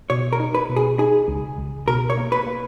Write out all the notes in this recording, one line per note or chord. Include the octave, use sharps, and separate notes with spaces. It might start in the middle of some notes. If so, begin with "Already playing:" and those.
B2 C#5
A#4
D#4
B4
B2
G#4
D#4 G#4
C#2
C#2
B2 A#4
C#5
A#3
B4
A#3